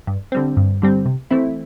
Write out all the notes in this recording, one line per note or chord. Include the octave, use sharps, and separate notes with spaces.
G2
D3 G3 C4
G2
D3 G3 C4
C3
E3 A3 C4 E4